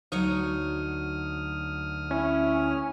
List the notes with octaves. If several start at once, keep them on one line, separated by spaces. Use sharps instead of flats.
D2 F#3 D#4 C#5 D#6 F6
C#4 E4